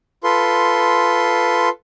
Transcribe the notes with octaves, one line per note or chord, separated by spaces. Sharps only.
F4 A4 B4 C6